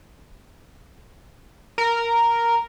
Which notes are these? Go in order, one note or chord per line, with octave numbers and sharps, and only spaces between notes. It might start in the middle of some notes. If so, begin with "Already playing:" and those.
A#4